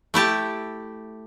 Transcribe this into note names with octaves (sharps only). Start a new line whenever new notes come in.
A3 E4 G4 A5